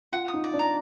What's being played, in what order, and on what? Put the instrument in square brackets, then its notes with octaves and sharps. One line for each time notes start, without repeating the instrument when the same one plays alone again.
[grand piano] F4 [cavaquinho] F#5
[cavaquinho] D#6
[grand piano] D#4
[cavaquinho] D5
[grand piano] D4
[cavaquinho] A#5